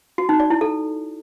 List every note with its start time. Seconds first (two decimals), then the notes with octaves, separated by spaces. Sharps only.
0.18 F#4
0.29 D#4
0.40 D5
0.50 E4
0.61 A4